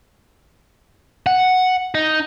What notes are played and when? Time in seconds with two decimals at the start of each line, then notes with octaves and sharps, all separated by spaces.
1.26 F#5
1.95 D#4